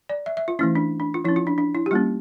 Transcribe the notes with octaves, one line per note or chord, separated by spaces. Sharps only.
D5
E5
E5
F4
E3 A3 C#4 E4
D4
D4
F4
F3 C#4 E4
F4
D4
D4
E4
G4
G3 A#3 C#4 F4